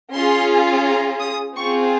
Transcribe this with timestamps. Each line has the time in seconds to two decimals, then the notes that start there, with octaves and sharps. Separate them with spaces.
0.14 C#4 F4 G#4 C6
0.85 A#5
1.20 D#6
1.55 C4 F4 G#4 C#6